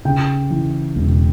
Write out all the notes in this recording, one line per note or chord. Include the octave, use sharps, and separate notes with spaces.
C#3 G5
E3
E1